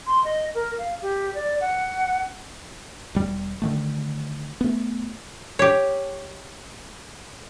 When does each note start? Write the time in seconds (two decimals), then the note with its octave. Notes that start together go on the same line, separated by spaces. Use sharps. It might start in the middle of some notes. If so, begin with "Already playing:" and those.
0.07 C6
0.25 D#5
0.55 A#4
0.78 F5
1.02 G4
1.34 D5
1.61 F#5
3.15 E1 G3
3.62 D3 D#3 A3
4.61 A3 B3
5.59 G4 C#5